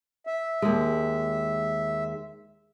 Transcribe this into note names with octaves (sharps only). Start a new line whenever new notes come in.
E5
D#2 G#3